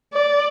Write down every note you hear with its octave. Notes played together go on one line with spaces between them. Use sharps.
D5